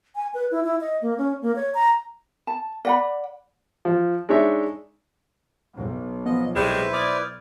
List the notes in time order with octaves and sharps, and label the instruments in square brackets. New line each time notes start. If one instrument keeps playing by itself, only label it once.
[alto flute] G#5
B4
E4
E4
D#5
A#3
C#4
A#3
C#5
A#5
[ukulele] A5
D5 F#5 B5
[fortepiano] F3
G#3 D4 D#4 C#5 E5
[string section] B1
[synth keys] F3 B3 [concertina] D#5
[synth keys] C2 [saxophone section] A2 G3 G#3 [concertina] E4 B4 C5
[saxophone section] D5 [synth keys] D#6 F6 G#6